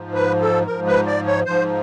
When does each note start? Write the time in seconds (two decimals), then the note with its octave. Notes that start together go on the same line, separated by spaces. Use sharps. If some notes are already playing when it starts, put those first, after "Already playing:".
Already playing: G#2 F3
0.14 B4
0.41 A4
0.66 G#2 F3 A#4
0.87 B4
1.07 D5
1.26 C#5
1.45 G#2 F3 C5